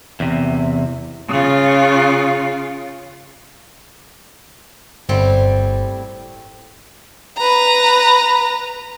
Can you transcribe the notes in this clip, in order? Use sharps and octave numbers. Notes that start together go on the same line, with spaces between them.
E2 C3
C#3 F4
G1 A2 G3 C4
B4 A#5